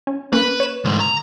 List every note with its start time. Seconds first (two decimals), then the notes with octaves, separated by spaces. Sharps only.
0.07 C#4
0.33 A#3 C#4 B4
0.60 C#5 E7
0.85 D2 G#2
1.00 A#5